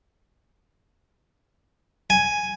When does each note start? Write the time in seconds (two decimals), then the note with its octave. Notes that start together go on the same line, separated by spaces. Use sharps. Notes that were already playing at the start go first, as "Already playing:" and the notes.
2.10 G#5